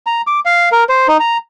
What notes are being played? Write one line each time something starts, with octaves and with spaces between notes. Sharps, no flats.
A#5
D6
F5
A#4
C5
D#4
A#5